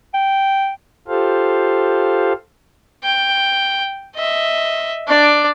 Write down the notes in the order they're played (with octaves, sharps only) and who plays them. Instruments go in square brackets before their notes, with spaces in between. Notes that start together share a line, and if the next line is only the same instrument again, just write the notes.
[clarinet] G5
[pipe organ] F4 G4 A4 C5 F5
[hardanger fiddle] G5
D#5 E5
D4 D5